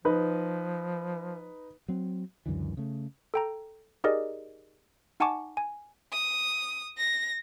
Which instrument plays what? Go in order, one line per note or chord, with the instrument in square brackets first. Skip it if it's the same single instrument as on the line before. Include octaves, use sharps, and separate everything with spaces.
[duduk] F3 [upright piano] D#4 B4
[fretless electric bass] F#3 C4
C#2 F#2 D3 E3
C#3 A3
[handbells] A4 G5 A#5
D#4 G4 G#4 A#4 D5 D#5
D#4 F#5 G#5 A5 C#6 D6
G#5
[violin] D#6
A#6